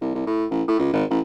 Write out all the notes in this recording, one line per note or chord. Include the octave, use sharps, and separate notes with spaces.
C2
C2
A2
A1
A2
C#2
G#1
A1